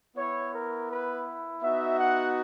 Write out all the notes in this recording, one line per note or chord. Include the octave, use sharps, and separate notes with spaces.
B3 E4 C#5
A#4
B4
B3 D#4 F#4 E5
F#5